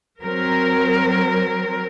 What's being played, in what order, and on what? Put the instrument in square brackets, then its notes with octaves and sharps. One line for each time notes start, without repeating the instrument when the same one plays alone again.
[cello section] F#3 C4 A#4